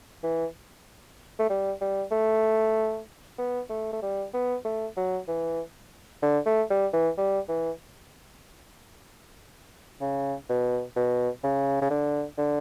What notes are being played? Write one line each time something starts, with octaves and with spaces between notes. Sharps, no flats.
E3
A3
G3
G3
A3
B3
A3
A3
G3
B3
A3
F#3
E3
D3
A3
G3
E3
G3
E3
C#3
B2
B2
C#3
C#3
D3
D3